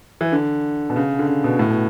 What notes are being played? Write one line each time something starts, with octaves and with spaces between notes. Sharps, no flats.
E3
D3
B2
C#3
D3
C#3
B2
A2
B2